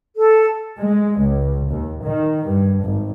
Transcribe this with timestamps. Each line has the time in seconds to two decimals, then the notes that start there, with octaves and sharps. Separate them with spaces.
0.16 A4
0.78 G#3
1.20 C#2
1.69 D#2
2.03 D#3
2.47 G2
2.83 G#1